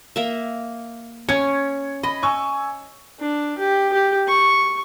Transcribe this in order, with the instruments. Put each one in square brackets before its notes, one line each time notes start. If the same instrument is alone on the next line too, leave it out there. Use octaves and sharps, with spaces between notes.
[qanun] A#3 E5
[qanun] C#4 [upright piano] G#6 C#7
[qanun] D#5 [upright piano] B5
[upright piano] G#5 C#6 E6
[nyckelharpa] D4
G4
G4
C#6